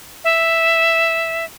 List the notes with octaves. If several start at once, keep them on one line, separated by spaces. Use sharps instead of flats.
E5